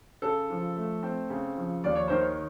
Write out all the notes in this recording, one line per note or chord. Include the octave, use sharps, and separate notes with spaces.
C#3 A4
F3
A3
C4
C#3
F3
D#2 D5
C#5
D#3 C5
C#5